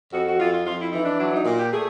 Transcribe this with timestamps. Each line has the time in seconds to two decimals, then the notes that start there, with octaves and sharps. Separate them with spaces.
0.13 F2 F#4
0.26 F#4
0.39 F2 F4
0.52 F4
0.65 F2 F4
0.79 E4
0.92 E3 D#4
1.05 D4
1.18 F#3 D4
1.32 D#4
1.45 A#2
1.58 G4
1.71 A3 G#4